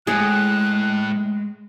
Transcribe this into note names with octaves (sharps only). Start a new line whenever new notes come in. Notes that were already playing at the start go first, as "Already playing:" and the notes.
A2 G#3 G#4 F#6